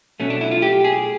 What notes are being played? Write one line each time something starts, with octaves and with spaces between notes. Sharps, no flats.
B2 F#3 A3 C#4
D4
E4
F4
G4
G#4